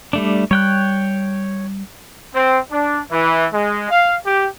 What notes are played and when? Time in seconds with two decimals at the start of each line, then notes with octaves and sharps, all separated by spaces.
0.13 G3 A3 D4
0.51 G3 C#5 G5 F#6
2.34 C4
2.71 D4
3.10 E3
3.53 G#3
3.90 F5
4.26 G4